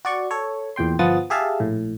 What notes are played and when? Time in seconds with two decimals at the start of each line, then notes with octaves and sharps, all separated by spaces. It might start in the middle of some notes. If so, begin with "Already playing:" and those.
0.05 F#4 D5 C#6
0.31 A4 C#5
0.76 E2 A#2 G5 C6
0.99 G1 F3 B3 F#5 D#6 A6
1.30 G4 G#4 E5 F5 A5
1.60 A#1 A2